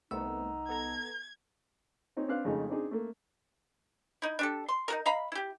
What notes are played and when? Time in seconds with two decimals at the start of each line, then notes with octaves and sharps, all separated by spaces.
0.11 C2 A3 B3 C4 D#4 F#5 E6
0.69 B3 A4 A#5 G#6
2.17 C4 C#4 D#4 C#5
2.28 C4 D4 B4 F5 F#6
2.45 F2 C#3 G#3 A3 D#4
2.69 C4 D4 D#4 G#4
2.91 A3 A#3
4.22 D#4 E4
4.39 D4 G4 A4
4.68 C6
4.88 D#4 F#4 A#4
5.06 D#5 F5 A#5 B5
5.32 E4 G4